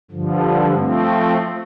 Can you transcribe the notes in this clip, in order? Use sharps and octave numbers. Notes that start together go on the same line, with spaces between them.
G2 D3 F3
F3 A3 C4